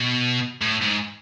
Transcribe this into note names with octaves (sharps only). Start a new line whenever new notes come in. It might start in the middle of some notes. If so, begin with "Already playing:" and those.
Already playing: B2
A2
G#2